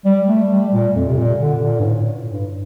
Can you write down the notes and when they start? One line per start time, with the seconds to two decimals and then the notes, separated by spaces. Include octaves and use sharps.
0.05 G3
0.27 A3
0.50 G3
0.72 A#2
0.95 F2
1.08 C3
1.17 A#2
1.40 D3
1.62 A#2
1.80 G2
1.85 A2
2.30 G2